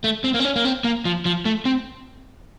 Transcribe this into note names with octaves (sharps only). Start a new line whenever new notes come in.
A3
C4
A#3
C4
C#4
A#3
C4
A#3
F3
F3
A3
C4